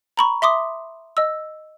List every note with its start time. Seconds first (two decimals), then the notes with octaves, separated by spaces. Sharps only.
0.17 A#5 B5 C#6
0.42 E5 C6 D6 D#6
1.17 D#5 E6